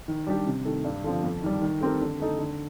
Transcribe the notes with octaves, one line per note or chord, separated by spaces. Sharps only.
D#3
G3 D4 G4
C3
D#3 A3
G2
D3 F3 C4
F2
D#3 G3
D#3
A3 C4 G4 A#4
D3
A3 D#4 A4
D3